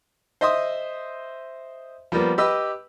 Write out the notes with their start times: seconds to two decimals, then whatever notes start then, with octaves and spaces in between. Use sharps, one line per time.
0.41 C5 D#5 E5 C6 D#6
2.12 F3 G3 A#3 B3
2.38 G4 B4 D#5 B5 E6